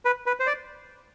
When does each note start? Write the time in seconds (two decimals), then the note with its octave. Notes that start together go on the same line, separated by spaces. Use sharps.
0.05 B4
0.26 B4
0.40 C5
0.47 D5